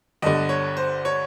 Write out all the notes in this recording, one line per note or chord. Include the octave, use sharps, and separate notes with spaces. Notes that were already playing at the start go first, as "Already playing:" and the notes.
G1 G2 D3 D#5
C#5
C5
C#5